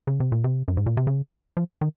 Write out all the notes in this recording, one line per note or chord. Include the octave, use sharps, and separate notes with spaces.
C#3
C3
A#2
C3
F#2
G#2
A#2
C3
C#3
F3
D#3